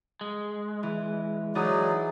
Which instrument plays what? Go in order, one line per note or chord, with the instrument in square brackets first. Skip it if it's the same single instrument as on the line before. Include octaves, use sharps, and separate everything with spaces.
[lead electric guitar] G#3
[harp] E3
[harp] E3 G#4 [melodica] F#3 D#4 D5